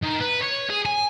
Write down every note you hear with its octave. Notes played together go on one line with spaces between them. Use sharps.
D#3
B4
C#5
G#4
G#5